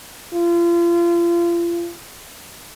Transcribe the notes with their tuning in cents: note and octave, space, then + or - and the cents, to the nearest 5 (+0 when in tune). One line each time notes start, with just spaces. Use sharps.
F4 -35